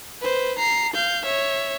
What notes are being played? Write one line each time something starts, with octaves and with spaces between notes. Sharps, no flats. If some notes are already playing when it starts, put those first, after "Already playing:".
B4 C5
A#5 C7
F5 G6
C#5 E5